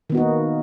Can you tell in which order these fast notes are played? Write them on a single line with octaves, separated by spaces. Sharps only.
D#3 B3 F#4 D#4 A#3